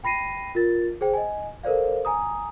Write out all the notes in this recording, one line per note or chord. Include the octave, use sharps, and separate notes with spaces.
G5 B5 A#6 C7 D#7
F4 A#4 A6
G#4 C5 G5
D#5 G#5
A4 A#4 C5 D5 F5
G#5 A#5 D#6